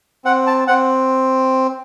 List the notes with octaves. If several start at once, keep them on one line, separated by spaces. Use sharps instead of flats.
C4 F#5
A5
C4 F#5